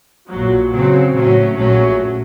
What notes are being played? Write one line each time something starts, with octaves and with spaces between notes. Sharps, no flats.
A#1 A#2 F#3
C#3 F#3 C4
A2 F#3 A3 C#4
A#1 A#2 F#3 A3 C#4